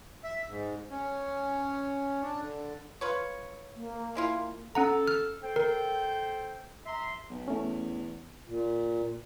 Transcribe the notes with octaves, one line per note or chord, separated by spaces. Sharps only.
E5
G#2
C#4
D4
D3
F4 B4 C#5
A#3
G#3 E4 F4
C#4 A4 F#5 A#5
F6
A4 C5 G5
A#4
E5 A#5 C6
B1
E2 A3 C#4
A#2